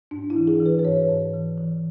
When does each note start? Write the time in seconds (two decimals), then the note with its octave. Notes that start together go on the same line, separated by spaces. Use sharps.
0.11 G#2 D4
0.30 E4
0.36 E3
0.47 G#4
0.60 E3
0.66 B4
0.79 B4
0.84 G#2 C#5
1.09 G#2
1.34 E3
1.58 E3